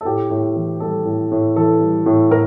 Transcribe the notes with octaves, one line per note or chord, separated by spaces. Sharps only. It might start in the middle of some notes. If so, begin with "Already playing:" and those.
A4
A2 G4
A2
E3
G3 A4
A2
A2
E3 A4
G3
A2
A2 A#4